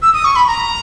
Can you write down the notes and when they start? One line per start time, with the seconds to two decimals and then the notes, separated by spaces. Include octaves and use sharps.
0.02 E6
0.13 D#6
0.25 C#6
0.36 B5
0.47 A#5